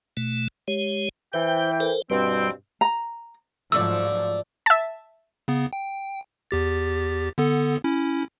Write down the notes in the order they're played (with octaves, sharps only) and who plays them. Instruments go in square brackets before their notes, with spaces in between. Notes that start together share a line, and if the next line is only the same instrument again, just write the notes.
[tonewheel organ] B2 A3
G#3 G4 C#5
[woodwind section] E3 G5 [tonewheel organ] C5
[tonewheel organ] A4 A#4 C5
[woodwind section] G2 B2 C4 [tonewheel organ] G3
[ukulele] A#5
[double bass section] G#2 F3 F#3 [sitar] A3 D5 [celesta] E6
[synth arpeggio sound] E5 A5
[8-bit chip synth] C#3 B3
G5
E2 G4 A6
D3 B3 A4
C#4 E4